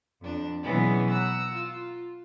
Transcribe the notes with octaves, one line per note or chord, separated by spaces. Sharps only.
F2 D4
B2 E3 F#3 G#3 B3 C#4
F#5 A#5 E6
F4